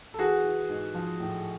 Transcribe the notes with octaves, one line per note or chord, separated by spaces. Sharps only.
A4
E3 F#4 G#4
E3
G#2
F3
A2